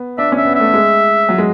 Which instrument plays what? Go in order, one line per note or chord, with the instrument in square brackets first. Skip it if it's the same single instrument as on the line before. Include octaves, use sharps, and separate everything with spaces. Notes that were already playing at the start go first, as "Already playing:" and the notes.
Already playing: [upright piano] B3
[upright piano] D4 [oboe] E5
[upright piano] C#4
[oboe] E5
[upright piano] B3
[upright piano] A3 [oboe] E5
[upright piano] G#3
F#3
G#3